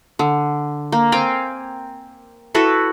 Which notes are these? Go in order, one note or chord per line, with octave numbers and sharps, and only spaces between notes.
D3
A#3
C4 F5 G5 G#5
E4 F#4 A4 B4